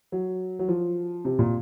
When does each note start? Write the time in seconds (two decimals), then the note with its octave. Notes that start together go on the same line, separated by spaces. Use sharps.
0.12 F#3
0.59 F#3
0.68 F3
1.25 C3
1.39 A#2